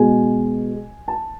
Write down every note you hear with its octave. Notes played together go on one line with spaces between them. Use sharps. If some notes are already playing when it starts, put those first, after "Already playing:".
Already playing: B2 G#3 G#5
A5